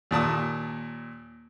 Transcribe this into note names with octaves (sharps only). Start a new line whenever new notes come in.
D#2 A#2 A5 D#6